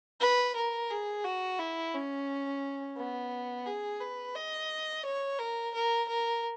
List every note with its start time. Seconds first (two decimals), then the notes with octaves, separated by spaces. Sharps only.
0.21 B4
0.56 A#4
0.90 G#4
1.24 F#4
1.59 E4
1.94 C#4
2.97 B3
3.66 G#4
4.01 B4
4.36 D#5
5.05 C#5
5.39 A#4
5.74 A#4
6.08 A#4